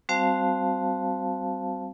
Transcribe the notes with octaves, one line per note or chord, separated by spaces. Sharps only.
G3 C4 F#4 C5 F5 A5